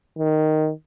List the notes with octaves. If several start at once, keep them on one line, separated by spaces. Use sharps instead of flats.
D#3